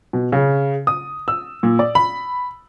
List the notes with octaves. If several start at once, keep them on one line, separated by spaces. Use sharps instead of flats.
B2
C#3
D#6
E6
A#2
D5
B5